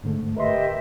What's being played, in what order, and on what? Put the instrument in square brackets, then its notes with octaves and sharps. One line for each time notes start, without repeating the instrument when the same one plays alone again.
[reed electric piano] G#2 D3 A3
[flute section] G4 D#5 E5 [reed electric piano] A#4 B4 C6